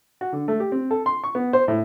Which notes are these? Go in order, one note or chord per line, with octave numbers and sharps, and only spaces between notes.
F#4
D3
A3
G4
C4
A4
C6
C#6
B3
C5
A2